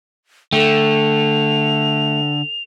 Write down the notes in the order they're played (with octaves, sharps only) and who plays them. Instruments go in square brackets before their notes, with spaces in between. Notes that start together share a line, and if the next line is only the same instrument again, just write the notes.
[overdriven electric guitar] D3 [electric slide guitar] A3 [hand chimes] A4 G5 [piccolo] F7